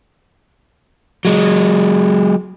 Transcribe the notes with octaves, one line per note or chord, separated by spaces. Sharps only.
F#3 G#3